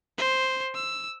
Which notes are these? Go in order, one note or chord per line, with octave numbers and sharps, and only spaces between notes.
C5
E6